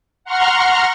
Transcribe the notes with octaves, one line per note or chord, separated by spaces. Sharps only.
F#5 A#5 C6 C#6 F6